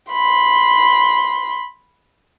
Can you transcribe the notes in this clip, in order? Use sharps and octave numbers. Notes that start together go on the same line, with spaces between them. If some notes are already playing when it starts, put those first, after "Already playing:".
B5 C6